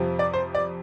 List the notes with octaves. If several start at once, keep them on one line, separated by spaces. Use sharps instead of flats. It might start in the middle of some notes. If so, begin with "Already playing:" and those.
Already playing: F2 C3 F3
D5
C5
D5